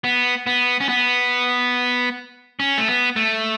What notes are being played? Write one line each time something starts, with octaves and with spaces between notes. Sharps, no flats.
B3
B3
C#4
B3
C#4
A3
B3
A3